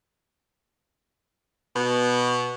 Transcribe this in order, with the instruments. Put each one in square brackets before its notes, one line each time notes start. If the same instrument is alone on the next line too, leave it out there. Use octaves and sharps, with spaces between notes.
[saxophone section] B2